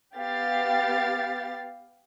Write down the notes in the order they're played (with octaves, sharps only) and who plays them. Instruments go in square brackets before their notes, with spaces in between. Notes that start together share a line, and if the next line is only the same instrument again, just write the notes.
[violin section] B3 G4 F5 A6